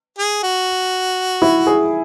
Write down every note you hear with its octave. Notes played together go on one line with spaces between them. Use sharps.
G#4
F#4
E4
G#4